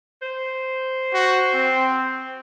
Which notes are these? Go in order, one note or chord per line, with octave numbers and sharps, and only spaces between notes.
C5
F#4
C4